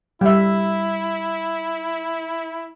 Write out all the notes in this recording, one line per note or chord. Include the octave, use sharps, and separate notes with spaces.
G3 E4 E5